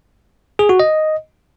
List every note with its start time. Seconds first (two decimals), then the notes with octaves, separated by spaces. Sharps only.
0.59 G#4
0.69 F#4
0.80 D#5